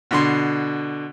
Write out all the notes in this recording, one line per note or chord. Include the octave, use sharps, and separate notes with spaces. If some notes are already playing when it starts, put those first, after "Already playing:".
B2 D3 C6